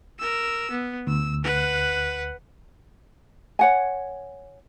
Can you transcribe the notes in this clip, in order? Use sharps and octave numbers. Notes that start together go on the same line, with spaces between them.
A#4 E6
B3
D2 E6
B4 F#5
C#5 F#5 G#5